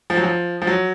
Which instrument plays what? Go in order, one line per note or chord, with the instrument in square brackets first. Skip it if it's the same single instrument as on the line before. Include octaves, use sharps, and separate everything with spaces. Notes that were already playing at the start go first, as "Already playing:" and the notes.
[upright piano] F3
F#3
F3
F3
F#3